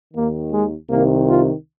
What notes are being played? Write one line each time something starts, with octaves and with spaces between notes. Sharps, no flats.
D#2 D#3 A#3
G#3
C2 C3 D#3 A#3
F4